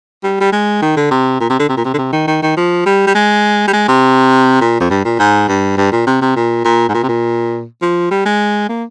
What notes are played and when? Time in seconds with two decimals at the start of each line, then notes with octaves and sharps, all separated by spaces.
0.23 G3
0.40 G3
0.52 G#3
0.82 D#3
0.96 D3
1.11 C3
1.40 A#2
1.50 C3
1.59 D3
1.69 C3
1.77 A#2
1.85 C3
1.94 D3
1.98 C3
2.12 D#3
2.27 D#3
2.42 D#3
2.57 F3
2.86 G3
3.06 G3
3.15 G#3
3.67 G3
3.73 G#3
3.88 C3
4.61 A#2
4.80 F2
4.90 G2
5.04 A#2
5.19 G#2
5.48 G2
5.77 G2
5.92 A#2
6.06 C3
6.21 C3
6.36 A#2
6.65 A#2
6.89 G#2
6.94 A#2
7.03 C3
7.08 A#2
7.82 F3
8.11 G3
8.25 G#3
8.69 A#3